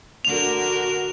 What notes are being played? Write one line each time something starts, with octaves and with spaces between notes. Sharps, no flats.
D3 F#4 A#4 F7